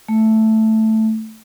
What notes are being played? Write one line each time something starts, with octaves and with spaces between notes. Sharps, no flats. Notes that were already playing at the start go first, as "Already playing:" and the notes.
A3